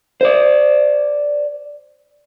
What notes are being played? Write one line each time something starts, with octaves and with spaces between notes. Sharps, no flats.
C5 D5